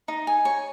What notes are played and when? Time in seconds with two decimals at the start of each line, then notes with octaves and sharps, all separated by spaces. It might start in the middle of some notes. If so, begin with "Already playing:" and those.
0.08 D#4
0.27 G#5
0.45 C#5